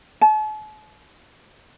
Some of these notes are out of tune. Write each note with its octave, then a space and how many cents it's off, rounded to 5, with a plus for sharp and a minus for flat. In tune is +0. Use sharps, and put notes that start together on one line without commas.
A5 -45